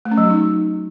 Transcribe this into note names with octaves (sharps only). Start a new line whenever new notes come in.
A3
C#4
F#3
F#4
D#4